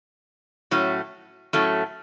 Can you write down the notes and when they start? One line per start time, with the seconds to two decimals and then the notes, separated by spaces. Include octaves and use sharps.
0.71 A2 F#3 A3 C#4
1.53 A2 F#3 A3 C#4